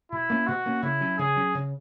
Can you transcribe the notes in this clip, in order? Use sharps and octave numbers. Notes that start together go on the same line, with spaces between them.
B2 E4
A#3 C#4
B2 F#4
A#3 C#4
C#3 E4
F#3 C#4
C#3 G#4
F#3 C#4
C#3